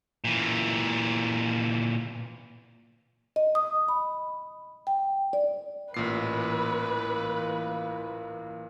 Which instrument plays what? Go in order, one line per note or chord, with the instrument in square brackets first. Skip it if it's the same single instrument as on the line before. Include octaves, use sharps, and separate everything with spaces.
[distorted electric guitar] A#2 E3
[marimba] D#5
D#6
B5
G5
D5
[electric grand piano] A1 A#2 C7 [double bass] E3 A#3 [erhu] B4